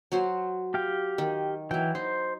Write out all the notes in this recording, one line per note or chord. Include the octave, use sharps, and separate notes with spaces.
F#3 F#4 C5
G4 F5 G5
D#3
E3 F#3 E4 G5
D#4 C5